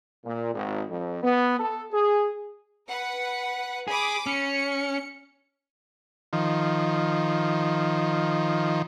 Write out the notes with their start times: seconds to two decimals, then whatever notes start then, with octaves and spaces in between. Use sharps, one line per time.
0.24 A#2
0.54 G#1
0.89 F2
1.22 B3
1.59 A4
1.92 G#4
2.88 B4 F#5
3.88 G#4 B5 D6 D#6
4.26 C#4 C#7
6.33 D#3 F3